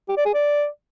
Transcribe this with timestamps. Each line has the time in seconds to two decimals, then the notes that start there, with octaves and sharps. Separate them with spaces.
0.09 G4
0.17 D5
0.25 G#4
0.34 D5